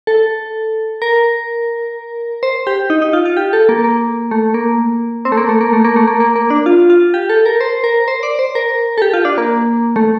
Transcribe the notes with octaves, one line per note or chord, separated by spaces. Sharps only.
A4
A#4
C5
G4
D#4
D#4
F4
F4
G4
A4
A#3
A#3
A3
A#3
C4
A3
A#3
A3
A#3
A3
A#3
A3
A#3
A#3
A#3
D4
F4
F4
G4
A4
A#4
C5
A#4
C5
D5
C5
A#4
A4
G4
F4
D4
A#3
A3